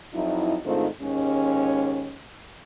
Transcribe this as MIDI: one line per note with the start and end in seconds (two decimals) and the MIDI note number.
0.14 0.57 41
0.14 0.57 54
0.14 0.57 63
0.14 0.57 64
0.65 0.87 44
0.65 0.87 51
0.65 0.87 57
0.65 0.87 60
0.65 0.87 62
0.65 0.87 65
1.01 2.18 39
1.01 2.18 44
1.01 2.18 56
1.01 2.18 61